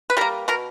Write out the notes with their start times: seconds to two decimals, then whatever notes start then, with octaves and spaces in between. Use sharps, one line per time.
0.10 B4
0.17 G3 A#3 A#4
0.48 B2 A#4